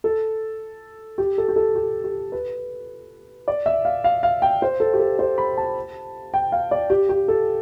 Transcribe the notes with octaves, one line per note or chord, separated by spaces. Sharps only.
A4
G4
A4
G4
A4
G4
G4
B4
D5
E5
F5
F5
F5
G5
C5
A4
G4
A4
C5
B5
A5
G5
F5
D5
G4
G4
A4